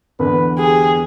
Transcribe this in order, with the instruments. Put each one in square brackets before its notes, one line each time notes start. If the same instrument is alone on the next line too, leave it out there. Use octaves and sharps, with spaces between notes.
[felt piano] E2 D3 [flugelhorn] B4
[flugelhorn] G4 [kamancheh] G#4